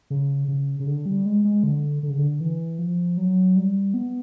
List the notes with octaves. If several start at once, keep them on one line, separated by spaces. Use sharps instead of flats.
C#3
C#3
C#3
D3
G3
G#3
G#3
D3
D3
C#3
D3
E3
F3
F#3
G3
B3